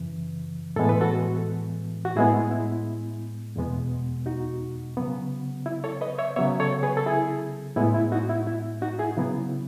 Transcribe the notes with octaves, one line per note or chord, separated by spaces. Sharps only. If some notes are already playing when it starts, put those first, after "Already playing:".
Already playing: F#2 C#3 E3
A2 E3 G#3 B3 A4
B4
F#4 A4
F#4
A2 G#3 B3 E4 G#4
E4
E2 B2 G#3 B3
D#4 F#4
C#3 F#3 B3
E4
A4 C#5
B4 D#5
C#5 E5
C#3 F#3 B3 C#5 E5
A4 C#5
G#4 B4
A4
E4 G#4
A2 G#3 B3 E4
E4
D#4 F#4
E4
E4
D#4 F#4
E4 G#4
C#3 F#3 B3 E4